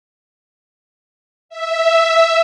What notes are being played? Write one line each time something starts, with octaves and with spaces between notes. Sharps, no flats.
E5